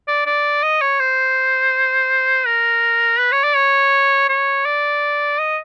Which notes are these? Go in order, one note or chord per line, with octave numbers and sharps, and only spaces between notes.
D5
D5
D#5
C#5
C5
A#4
B4
C#5
D5
C#5
C#5
D5
D#5